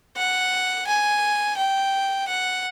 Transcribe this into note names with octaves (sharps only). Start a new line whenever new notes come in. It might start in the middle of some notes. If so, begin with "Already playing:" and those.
F#5
G#5
G5
F#5